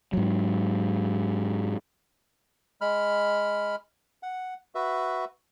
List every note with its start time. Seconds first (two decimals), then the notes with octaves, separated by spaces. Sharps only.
0.13 G#2 F#3
2.81 G#3 B5 F6
4.23 F#5
4.75 F#4 B4 E5